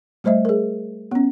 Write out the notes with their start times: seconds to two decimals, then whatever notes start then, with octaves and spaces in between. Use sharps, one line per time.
0.24 G3 A3 C5 D#5 E5
0.45 G#4 A#4
1.11 B3 C#4